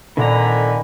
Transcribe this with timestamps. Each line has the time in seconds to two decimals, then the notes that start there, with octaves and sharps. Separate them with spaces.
0.17 F2 A#2 D3 D#3 A#3 G#5 A#5 B5